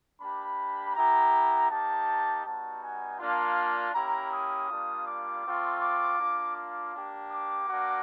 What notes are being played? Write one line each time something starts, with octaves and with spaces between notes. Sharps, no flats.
A#3 D4 G4 B5
B3 E4 G4 A#5
A#3 D#4 G4 A5
G3 B3 D#4 F#4 A5
G#5
A#3 D4 F4
A#3 C#4 E4 G4 A#5
D#6
G3 A#3 D4 F4
D6
A3 C4 F4
D6
A#3 D4 F4
D6
A#3 D4 G4
D6
A#3 D4 F#4